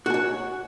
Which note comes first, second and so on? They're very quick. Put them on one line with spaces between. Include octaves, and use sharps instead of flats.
F#4 G#5 C#5